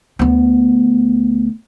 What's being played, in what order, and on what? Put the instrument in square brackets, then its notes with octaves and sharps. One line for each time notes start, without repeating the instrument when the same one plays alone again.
[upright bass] D2 B3